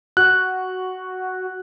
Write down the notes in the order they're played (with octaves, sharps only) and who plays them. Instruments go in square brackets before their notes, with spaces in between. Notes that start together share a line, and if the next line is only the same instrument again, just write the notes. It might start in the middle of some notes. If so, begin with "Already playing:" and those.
[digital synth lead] F#4 [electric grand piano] F#6